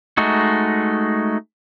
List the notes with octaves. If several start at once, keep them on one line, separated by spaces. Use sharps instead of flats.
G#3 A3 D#4 F#4